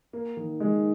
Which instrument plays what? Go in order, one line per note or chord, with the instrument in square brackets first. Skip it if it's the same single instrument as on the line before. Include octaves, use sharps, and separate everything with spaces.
[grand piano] A#3
D#3
[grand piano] D#3 [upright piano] G#3